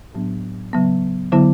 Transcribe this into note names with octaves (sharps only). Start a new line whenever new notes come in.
A2 F#3 B3 D4
C#3 F#3 B3
D3 F#3 B3 E4